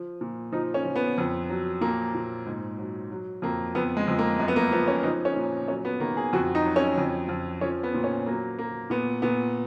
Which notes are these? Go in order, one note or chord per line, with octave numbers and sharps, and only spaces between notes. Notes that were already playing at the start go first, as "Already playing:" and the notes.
Already playing: F3
A#2
F3 D#4
C#4
F3
B3
F2
F#3
A#2 A#3
A#2
G#2
F#3
F#3
F2 A#3
F2 B3
G#3
F2
A#3
F#2 G#3
B3
A#3
F3 B3
C#4
F3 D#4
C#4
A#2
F#3 C#4
B3
D#3 A#3
G#4
F2 F#4
D#4
F#3
C#4
F2
F2
F3 C#4
B3
A#2
C#4
F#3 A#3
F#3 A#3
A#2 B3
A#2 B3